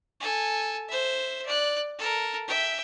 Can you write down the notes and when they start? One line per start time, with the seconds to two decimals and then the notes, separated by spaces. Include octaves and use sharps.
0.21 A4 G#5
0.88 C5 E5
1.45 D5 F#6
1.99 A4 A#4
2.48 E5 G5